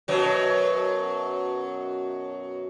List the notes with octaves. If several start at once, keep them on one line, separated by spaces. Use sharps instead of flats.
F#2 B2 F#3